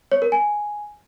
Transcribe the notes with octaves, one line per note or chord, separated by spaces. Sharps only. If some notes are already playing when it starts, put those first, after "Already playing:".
C#5
A#4
G#5